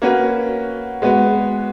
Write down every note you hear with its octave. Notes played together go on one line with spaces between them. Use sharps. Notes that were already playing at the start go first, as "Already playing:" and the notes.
A#3 C#4 F#4 B4
G#3 B3 F#4 B4